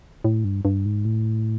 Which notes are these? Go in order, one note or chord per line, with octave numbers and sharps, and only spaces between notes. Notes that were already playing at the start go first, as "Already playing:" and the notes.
A2
G2
G2
G#2
A2